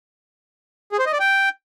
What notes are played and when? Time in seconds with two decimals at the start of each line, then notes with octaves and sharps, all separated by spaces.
0.92 G#4
0.99 C5
1.06 D#5
1.13 D5
1.20 G5